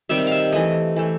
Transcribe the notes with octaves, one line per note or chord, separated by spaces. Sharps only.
C3 D#3 G3 E5
E5 F5
E3 A3 D#5
E3 A3